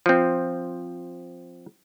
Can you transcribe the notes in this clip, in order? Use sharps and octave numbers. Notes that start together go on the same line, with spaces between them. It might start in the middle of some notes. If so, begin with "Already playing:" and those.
F3 C4